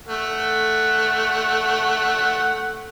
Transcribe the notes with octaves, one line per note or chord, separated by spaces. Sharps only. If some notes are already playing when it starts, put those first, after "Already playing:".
A3 F#5